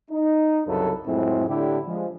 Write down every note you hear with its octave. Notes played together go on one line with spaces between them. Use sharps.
D#4
C2 F#2 C#3 A4 B4
F2 A2 F#3 G#3 C4 E4
A2 D3 D4 E4 G4
F3 G#3